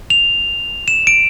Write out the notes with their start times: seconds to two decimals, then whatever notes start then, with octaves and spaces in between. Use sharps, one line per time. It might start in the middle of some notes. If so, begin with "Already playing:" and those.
0.10 F7
0.88 E7
1.07 D7